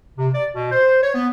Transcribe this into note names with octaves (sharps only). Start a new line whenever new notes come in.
C3
D5
B2
C5
C#5
B3